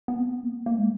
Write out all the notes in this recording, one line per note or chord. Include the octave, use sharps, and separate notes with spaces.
B3
C4
B3
A#3
A#3
G#3